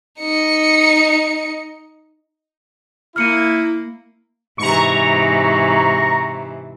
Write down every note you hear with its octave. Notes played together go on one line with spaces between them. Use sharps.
D#4 C#7
A#3 E4 F6 C#7 D#7
G#2 C3 E3 A#5 C#6